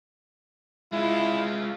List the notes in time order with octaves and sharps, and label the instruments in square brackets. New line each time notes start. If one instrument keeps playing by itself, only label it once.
[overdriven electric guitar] G#3 F4 [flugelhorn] E4